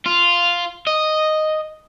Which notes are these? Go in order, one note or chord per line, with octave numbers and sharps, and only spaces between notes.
F4
D#5